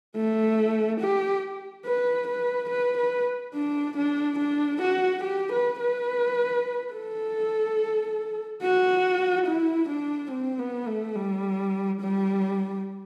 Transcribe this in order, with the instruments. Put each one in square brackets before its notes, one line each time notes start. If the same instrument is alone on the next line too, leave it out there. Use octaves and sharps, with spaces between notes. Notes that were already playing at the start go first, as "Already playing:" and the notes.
[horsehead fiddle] A3
G4
B4
B4
B4
B4
D4
D4
D4
F#4
G4
B4
B4
A4
F#4
E4
D4
C4
B3
A3
G3
G3